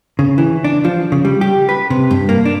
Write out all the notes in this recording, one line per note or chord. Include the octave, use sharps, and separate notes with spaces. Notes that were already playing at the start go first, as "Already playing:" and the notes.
C#3
E3
D4
F3
C#3
G3
G4
B4
C3
G2
A#3
D4